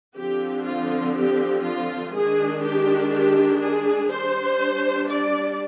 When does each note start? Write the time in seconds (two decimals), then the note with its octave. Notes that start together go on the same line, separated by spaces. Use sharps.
0.16 D3 F3 C4 G4
0.66 F4
1.16 G4
1.66 F4
2.14 D#3 G#3 D4 G#4
2.63 G4
3.14 G4
3.62 G#4
4.11 G3 D4 C5
5.10 D5